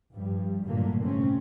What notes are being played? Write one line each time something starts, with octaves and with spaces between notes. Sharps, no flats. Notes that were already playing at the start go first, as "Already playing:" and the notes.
G2 F3 G3
G2 A#2 D3 F#3 A3 A#3
A2 C3 A3 C4 C#4